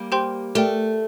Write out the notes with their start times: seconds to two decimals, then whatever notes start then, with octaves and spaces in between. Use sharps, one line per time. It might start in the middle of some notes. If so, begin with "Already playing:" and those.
Already playing: G3 A#3
0.12 G4 C5 G5 C6 G6
0.55 A3 G4 A#4 D5 G5